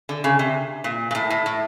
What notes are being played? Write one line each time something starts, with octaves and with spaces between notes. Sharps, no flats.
D3
C#3
C3
A#2
A#2
A2
A2
A2